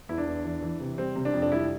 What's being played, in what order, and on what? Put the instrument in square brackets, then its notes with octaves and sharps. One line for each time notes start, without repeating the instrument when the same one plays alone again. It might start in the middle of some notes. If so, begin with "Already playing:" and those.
[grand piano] E2 E4
D4
E2
E3
E3
C3
G3 C4
C3
D4
F2
D4
G3 E4